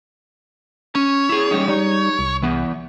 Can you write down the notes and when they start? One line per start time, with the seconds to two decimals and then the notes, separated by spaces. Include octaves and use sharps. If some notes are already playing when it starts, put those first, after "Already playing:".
0.95 C#4 C#5
1.29 E4 G#4
1.51 G3 C#4 D#4
1.68 G3 D#4
2.19 C2
2.42 E3 B3